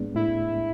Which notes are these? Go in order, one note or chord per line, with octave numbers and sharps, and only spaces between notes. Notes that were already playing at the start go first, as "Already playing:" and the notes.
Already playing: A2 G#3 B3 D4
A2 E4